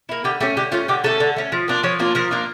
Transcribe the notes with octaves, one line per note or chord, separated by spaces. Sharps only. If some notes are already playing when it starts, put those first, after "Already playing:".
A#3 E4
D3 G4
A3 C#4 G4
D3 G4
A3 C#4 F4
D3 G4
A3 C#4 A4
D3
A3 C#4
F3
A#3 D4 F4
F3 C#5
A#3 D4 F4
F3 A#4
A#3 D4 F4